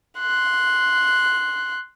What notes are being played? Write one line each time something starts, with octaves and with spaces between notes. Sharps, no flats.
C6 F#6